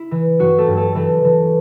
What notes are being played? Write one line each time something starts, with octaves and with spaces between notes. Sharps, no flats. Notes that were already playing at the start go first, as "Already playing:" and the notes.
Already playing: E4
E3
G2 F#3 F#4
A3 A4
G2
A3 A4
E3 A3 A4
E3